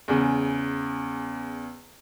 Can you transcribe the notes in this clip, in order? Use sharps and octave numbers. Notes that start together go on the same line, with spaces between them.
E2 C#3